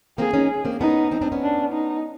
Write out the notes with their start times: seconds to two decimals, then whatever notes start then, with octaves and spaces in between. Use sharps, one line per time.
0.18 A#3 C4 G#4
0.33 C#4 D#4
0.65 A#3 C4
0.80 B3 C#4 D#4
1.11 C4 D4
1.21 C4 D4
1.32 B3 C#4
1.42 D4
1.73 D#4